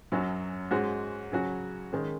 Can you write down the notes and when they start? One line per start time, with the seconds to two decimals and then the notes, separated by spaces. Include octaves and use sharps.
0.12 F#2 F#3 C#4 F#4
0.71 G#2 G#3 C#4 F#4
1.32 C#3 F#3 C#4 F#4
1.93 D#3 G#3 C#4